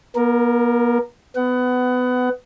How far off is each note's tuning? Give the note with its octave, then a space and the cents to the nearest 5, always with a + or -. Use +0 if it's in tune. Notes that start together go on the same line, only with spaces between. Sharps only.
B3 -45 A#4 +0
B3 +25 F#5 +20